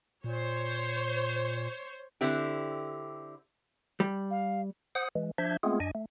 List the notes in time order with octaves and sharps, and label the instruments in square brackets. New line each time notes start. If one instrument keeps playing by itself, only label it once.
[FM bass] A#2 [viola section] C5 C#5
[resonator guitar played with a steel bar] D3 C4 E4 G4
[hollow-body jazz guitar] G3
[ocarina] F5
[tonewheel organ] C5 F#5 D#6
E3 G#3
F3 D4 E5 G6 G#6
G#3 A3 B3 C4 F4 G#4
F#2 D4 D#5 G#5
A3